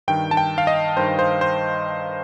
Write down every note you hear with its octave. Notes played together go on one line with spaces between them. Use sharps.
G2 D#3 G5
A5
G5
F5
D#5
G2 D#3 C5
C5
C5